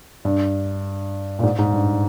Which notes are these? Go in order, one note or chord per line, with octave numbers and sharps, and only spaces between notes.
G2
A#2
G#2
G#2
G2